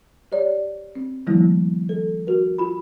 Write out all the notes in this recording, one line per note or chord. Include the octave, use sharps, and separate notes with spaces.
G4 C#5 D5
C4
D#3 F3 G3 A3 A#3 E4
A4
F#4 A#4
F4 B5